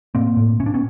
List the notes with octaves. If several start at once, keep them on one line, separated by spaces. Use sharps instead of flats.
A2 A#3 C4
A2
A2 C#4
D4
B3 C#4